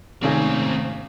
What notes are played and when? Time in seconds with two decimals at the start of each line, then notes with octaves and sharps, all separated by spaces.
0.23 G#1 G#2 C3 D#3 A3 C4 C#4 G#4